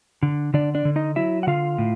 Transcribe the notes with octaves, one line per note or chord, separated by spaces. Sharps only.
D3
D3 D4 D5
D4 D5
D3
D#4 D#5
F#3 E4 E5
F#5
D3 F4 F5
A2